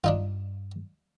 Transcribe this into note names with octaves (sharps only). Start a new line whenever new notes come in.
G2 D4 D#4 F4